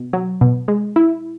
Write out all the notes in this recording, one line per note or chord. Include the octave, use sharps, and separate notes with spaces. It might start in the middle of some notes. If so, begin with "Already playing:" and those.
Already playing: B2
F#3
B2
G#3
E4